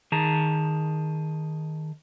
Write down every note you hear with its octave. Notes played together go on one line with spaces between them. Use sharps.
D#3 G#4 A5 A#5